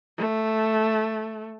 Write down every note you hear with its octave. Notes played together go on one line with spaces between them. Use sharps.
A3